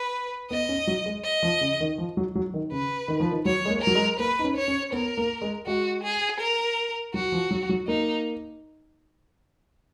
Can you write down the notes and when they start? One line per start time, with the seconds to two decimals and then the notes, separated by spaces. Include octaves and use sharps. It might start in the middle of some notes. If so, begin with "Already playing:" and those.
Already playing: B4
0.51 B3 D#5
0.69 C#4
0.87 F#3
1.06 G#3
1.24 D#5
1.43 F3
1.61 C#3
1.80 D#3
1.98 F3
2.17 F#3
2.35 F#3
2.54 D#3
2.72 C#3 B4
3.08 D#3
3.20 F3
3.31 D#3
3.45 F#3 C#5
3.65 G#3
3.70 A#3
3.82 F#3 A#4
3.95 G#3
4.19 A#3 B4
4.39 D#4
4.44 C#4
4.57 C#5
4.68 C#4
4.92 B3 A#4
5.17 A#3
5.42 G#3
5.66 G#3 F#4
6.04 G#4
6.40 A#4
7.14 F#3 F#4
7.32 F3
7.51 F#3
7.69 F#3
7.87 A#3 D#4